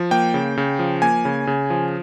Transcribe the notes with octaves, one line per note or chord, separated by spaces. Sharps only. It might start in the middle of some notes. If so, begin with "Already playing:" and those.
Already playing: F3
A#3 G5
C#3
C#3
F3
A#3 G#5
C#3
C#3
F3